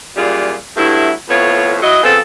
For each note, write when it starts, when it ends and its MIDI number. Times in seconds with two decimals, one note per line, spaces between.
0.17 0.54 42
0.17 0.54 46
0.17 0.54 55
0.17 0.54 65
0.17 0.54 68
0.77 1.11 43
0.77 1.11 54
0.77 1.11 57
0.77 1.11 64
1.29 1.77 41
1.29 1.77 45
1.29 1.77 59
1.29 1.77 65
1.29 1.77 73
1.82 2.01 54
1.82 2.01 64
1.82 2.01 75
2.04 2.19 49
2.04 2.19 53
2.04 2.19 59
2.04 2.19 60
2.04 2.19 69